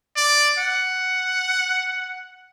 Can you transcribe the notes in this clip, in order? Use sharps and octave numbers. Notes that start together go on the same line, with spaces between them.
D5
F#5